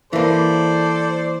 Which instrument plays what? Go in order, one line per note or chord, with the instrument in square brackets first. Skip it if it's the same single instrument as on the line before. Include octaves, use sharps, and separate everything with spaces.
[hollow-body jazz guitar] E3 A#3 [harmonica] A4 C5 D5